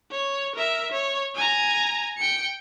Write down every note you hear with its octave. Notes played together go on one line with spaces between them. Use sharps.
C#5
A#4 E5
C#5
G#5 A#5
G5 C#7